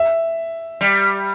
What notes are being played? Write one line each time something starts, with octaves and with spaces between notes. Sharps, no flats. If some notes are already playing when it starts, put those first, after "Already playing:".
Already playing: E5
G3